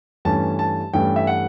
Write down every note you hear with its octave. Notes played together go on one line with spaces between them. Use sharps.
G2 E3 A3 C#4 A5
A5
G2 E3 A3 C#4 G5
E5
F#5